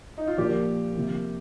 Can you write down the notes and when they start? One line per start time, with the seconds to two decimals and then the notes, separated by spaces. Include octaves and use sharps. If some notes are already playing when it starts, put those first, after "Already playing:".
0.18 D#4
0.28 F4
0.38 A#2 F3 A#3 D4 G4
0.95 C3 F3 A#3